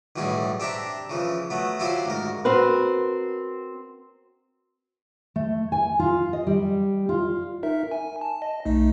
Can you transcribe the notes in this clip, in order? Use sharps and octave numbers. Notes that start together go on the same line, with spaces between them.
B1 E2 A2 G3 G#4
C4 D4 G4 E5 A#5
C#3 E3 F3
F#3 A3 B3
F#3 E4 F4 G4 C5 F5
D2 G#2 A#4
C4 F#4 A#4 B4
A3
G#5
F4
D#5
G3
F4
D#4 A#4 E5
G#5
A5
D#5
B1 A3 D#4